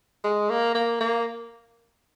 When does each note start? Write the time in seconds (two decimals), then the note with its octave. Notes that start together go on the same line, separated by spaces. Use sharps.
0.24 G#3
0.49 A#3
0.75 A#3
1.00 A#3